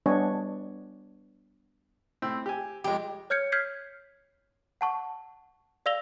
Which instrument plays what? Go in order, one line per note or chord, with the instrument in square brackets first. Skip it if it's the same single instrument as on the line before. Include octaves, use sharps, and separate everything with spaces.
[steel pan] G3 B3 D4 C#5 D#5 G#5
[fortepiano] A2 C4 E6
G4 G#5
[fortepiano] F2 G#3 [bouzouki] G4
[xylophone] C#5 F6 G6 G#6 C#7
F6 G6 G#6 B6 C7
F#5 A5 C#6
D5 F5 E6 A#6 F7 G7